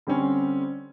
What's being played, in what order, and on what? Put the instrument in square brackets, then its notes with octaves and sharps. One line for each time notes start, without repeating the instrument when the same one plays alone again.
[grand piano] D3 G3 C4 C#4